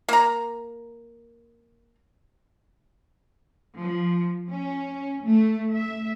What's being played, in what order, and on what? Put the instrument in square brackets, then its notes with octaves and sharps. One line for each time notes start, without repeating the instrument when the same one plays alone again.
[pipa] A#3 A#5
[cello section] F3
C#4
A3
E5